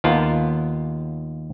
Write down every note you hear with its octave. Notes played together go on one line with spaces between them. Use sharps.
D#2 B3 F4 A#4 A5